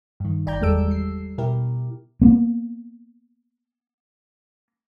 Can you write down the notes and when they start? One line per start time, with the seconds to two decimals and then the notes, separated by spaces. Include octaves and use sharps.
0.20 G2 D#3
0.46 G1 D5 G5 A#5 G6
0.61 E2 G3 G#3 A4 E6 D7
0.88 G3 C7
1.38 B2 E4 G4 A#4
2.21 A#3 B3